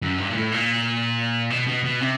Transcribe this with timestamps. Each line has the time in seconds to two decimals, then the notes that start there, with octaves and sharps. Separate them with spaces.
0.02 F#2
0.18 G2
0.30 A#2
0.34 A2
0.52 A#2
1.50 B2
1.67 B2
1.84 B2
2.01 C3